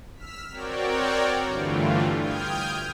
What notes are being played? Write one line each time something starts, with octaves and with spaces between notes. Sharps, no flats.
E6 F6 B6
C4 F#4 A#4 C#5 D5 G5
G2 D3 E3 G3 A3 F4
G5 D#6 F6 G6 G#6